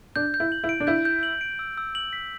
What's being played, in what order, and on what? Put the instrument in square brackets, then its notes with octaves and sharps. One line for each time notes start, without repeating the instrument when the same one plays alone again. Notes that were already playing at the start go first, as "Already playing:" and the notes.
[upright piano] D4 [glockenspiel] G6
[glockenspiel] G6
[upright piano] E4
[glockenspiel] F#7
[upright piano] E4
[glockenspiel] D7
[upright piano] D4
[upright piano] E4 [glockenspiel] G6
[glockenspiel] G6
F#7
D7
E6
E6
F#7
B6